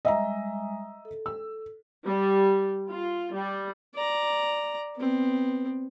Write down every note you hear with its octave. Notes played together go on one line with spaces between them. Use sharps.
G3 G#3 D#5 E5 G#5 A#5
A4
E6
G3
F4
G3
D5 A#5
B3 C4